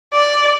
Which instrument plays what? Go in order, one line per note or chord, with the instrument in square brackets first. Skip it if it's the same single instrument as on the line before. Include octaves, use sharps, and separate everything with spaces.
[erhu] D5